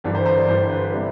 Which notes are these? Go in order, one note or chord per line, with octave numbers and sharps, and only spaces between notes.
G1 G2 E3 G3
C5
C5
D5
G1 G2 E3 G3 C5
B4
C3 G3